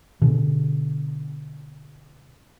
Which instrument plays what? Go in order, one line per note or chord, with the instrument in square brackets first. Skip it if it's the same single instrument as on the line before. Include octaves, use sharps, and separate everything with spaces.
[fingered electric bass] B2 D3